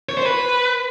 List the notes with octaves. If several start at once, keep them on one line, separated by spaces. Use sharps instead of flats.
C#5
C5
B4